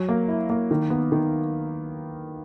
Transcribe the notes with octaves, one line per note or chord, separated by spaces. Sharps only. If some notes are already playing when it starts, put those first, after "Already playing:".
Already playing: F#3
A#3
E4
A#3
D#3
B3
D#3